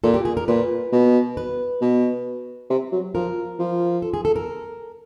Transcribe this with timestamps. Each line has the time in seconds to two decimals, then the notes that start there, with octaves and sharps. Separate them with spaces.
0.04 A#2 A4
0.14 G4
0.25 G#4
0.37 A#4
0.48 A#2 B4
0.92 B2
1.37 B4
1.81 B2
2.70 C3
2.92 F#3
3.14 F3 A#4
3.59 F3
4.02 A4
4.14 G#4
4.25 A4
4.36 A#4